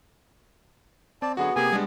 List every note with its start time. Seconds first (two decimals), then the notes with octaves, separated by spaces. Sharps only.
1.22 C4 D5 A5
1.37 D3 F#3 B3 F#4 G#4 F#5
1.56 C3 A#3 G4 G#4 G#5
1.72 G3 G#3 D4